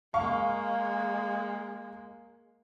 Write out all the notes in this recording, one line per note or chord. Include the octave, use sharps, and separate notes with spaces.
G#3 A#3 F5 C#6